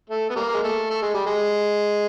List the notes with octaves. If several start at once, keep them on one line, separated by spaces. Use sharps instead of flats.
A3
B3
G3 A#3
G#3
A3
A3
G#3
G3
G#3